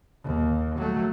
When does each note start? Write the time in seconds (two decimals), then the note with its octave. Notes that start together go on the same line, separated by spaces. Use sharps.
0.24 D#2
0.78 F#3 A3